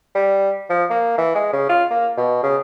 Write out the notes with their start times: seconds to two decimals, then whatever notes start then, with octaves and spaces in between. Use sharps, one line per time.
0.15 G3
0.70 F3
0.90 A#3
1.18 E3
1.35 G#3
1.53 C#3
1.69 F4
1.91 A#3
2.17 B2
2.43 C#3